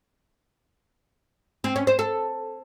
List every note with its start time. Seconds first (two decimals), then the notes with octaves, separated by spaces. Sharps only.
1.64 C4
1.76 C#4
1.87 C5
1.99 A4